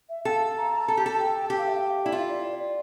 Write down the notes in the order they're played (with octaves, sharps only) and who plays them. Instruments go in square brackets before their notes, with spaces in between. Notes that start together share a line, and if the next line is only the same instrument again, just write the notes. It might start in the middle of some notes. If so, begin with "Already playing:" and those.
[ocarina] E5
[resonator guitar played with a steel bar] A4 [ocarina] G5
[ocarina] F5
A#5
[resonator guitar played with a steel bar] A4 [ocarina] A5
[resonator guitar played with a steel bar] G4
[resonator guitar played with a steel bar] A4 [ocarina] A5
[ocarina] G5
G5
[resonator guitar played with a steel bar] G4 [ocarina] G5
[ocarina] F5
E5
F5
[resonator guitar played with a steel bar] E4 [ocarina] D5
[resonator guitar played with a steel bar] F4 [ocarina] E5
[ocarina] D5
D5
D5